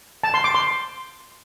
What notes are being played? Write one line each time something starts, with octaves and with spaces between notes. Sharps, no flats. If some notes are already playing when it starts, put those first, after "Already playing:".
A5
C6
D6
C6